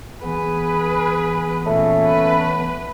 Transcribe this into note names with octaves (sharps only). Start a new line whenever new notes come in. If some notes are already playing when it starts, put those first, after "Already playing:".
E3 B3 G#4 B4
A#2 A3 C#4
B4